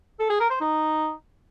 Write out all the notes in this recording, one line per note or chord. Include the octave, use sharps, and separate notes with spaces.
A4
G#4
A#4
C5
D#4